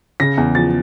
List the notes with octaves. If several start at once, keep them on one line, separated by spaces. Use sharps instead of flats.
C#3 A#6
E2
F3 A6